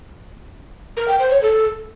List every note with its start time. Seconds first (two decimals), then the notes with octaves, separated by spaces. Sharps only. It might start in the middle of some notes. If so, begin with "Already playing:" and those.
0.97 A#4
1.08 G5
1.19 C5
1.30 C#5
1.42 A4